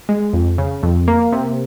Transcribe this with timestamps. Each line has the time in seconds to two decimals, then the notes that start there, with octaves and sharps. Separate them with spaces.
0.09 G#3
0.33 F2
0.58 C#3
0.83 F2
1.08 A#3
1.32 C3